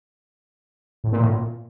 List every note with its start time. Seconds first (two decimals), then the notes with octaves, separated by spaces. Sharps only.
1.04 A2
1.12 A#2
1.21 A2
1.29 A#2